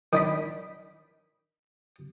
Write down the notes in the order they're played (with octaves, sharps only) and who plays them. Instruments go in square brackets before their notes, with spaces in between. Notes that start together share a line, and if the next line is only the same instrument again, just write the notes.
[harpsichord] D#3 D4 B5